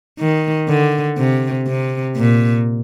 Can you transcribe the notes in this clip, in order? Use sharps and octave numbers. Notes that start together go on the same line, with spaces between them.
D#3
D3
C3
C3
A#2